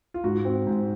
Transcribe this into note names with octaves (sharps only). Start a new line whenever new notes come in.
F4
G#2 F#4
C4
G#2